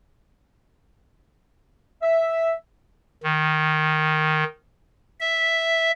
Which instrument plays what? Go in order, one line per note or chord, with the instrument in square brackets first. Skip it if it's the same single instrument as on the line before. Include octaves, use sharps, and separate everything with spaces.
[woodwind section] E5
[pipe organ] D#3
E5